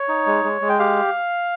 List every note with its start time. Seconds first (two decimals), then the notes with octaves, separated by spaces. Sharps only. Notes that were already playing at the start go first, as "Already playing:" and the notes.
Already playing: C#5
0.09 D#4
0.27 G#3
0.44 G#3
0.61 G#3
0.69 G5
0.79 G4 F5